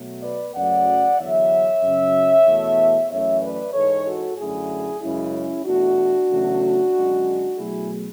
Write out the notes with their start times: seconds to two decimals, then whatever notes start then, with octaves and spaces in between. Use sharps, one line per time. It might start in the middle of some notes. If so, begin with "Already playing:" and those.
Already playing: B2 F#3 A3
0.23 B4 D5
0.54 F#2 C#3 F#3 A3 D5 F#5
1.18 E2 D3 F#3 C#5 E5
1.83 F#2 C#3 F#3
2.46 E2 B2 A3
3.10 F#2 E3 A3 C#5 E5
3.42 B4 D5
3.73 G#2 E3 G#3 A4 C#5
4.06 F#4 A4
4.38 F#2 D3 A3 E4 G#4
5.01 F#2 C#3 G#3 C#4 E4
5.65 E2 B2 A3 D4 F#4
6.29 E2 C#3 F#3 A3
6.93 F#2 D3 G#3
7.57 B2 F#3 A3 E4 G#4